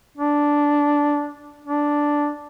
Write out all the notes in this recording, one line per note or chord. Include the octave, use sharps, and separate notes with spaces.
D4
D4